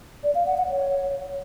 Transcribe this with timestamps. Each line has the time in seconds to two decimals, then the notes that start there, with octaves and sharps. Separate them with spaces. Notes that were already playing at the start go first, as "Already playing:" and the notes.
0.23 D5
0.35 F5
0.46 F#5
0.58 F#5
0.69 C#5